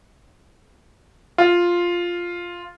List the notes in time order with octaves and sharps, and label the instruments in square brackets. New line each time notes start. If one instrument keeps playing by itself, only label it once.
[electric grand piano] F4